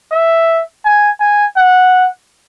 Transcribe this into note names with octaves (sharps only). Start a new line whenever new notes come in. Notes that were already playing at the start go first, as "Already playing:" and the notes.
E5
G#5
G#5
F#5